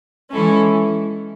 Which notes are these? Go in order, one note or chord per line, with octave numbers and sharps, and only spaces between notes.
E3 G#3 C#4 E4 A4